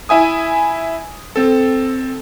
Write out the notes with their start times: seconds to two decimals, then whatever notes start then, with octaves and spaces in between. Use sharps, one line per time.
0.09 E4 E5 G#5 D#6
1.36 C4 A4